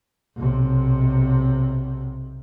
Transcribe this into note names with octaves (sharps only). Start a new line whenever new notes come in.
B1 C3